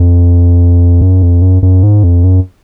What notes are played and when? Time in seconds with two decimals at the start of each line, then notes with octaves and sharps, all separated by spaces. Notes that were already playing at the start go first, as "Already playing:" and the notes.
Already playing: F2
1.01 F#2
1.22 F2
1.42 F#2
1.63 F#2
1.83 G#2
2.04 F2
2.24 F#2